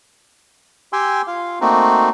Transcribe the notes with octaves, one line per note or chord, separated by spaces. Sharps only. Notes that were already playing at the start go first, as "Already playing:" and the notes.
G4 G5 G#5 C6 E6
F4 F5
A3 A#3 C4 D#4 F#4